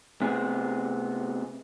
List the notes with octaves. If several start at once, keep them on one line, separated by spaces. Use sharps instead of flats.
C3 A3 B3 C4 G#4